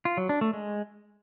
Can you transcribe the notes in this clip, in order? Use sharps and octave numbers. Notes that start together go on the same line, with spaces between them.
F4
F#3
D4
A3
G#3